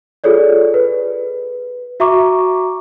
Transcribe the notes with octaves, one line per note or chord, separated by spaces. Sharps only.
F4 G#4 A4 C#5 D5
B4
F#4 E5 A#5 C#6 D6